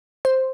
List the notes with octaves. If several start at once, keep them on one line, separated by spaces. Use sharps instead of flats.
C5